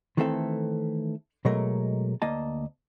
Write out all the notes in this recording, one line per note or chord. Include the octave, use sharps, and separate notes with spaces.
D#3 E3 A3 C4 A4 E5
B2 F#3 G#3 A3 A#4
D2 A#3 D#5 A5